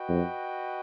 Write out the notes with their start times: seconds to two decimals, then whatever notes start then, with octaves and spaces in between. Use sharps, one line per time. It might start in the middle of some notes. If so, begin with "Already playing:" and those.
Already playing: F#4 B4 D#5 G5
0.09 F2